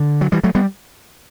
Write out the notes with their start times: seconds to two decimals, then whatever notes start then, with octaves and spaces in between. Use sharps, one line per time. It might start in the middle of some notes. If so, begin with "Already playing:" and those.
Already playing: D3
0.21 F#3
0.32 E3 G3
0.43 F#3 A3
0.55 G3 B3